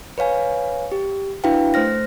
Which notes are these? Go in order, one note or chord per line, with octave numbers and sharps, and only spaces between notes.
B4 C#5 F5 G#5
G4
D4 E4 F#4 B4 F5 G5
A3 C5 F6 A#6